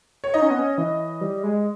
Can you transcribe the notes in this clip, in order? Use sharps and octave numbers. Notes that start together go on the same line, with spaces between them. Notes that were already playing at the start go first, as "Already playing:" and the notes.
C#5
D#4 D#5
C#4
B3
C#4
E3
G3
G#3